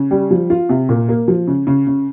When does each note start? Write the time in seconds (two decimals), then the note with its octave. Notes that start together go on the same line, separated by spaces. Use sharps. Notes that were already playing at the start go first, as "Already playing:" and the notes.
Already playing: C#3
0.11 G3
0.31 F3
0.50 F4
0.69 C3
0.89 A#2
1.09 A#3
1.28 F3
1.48 C#3
1.67 C#3
1.87 C#3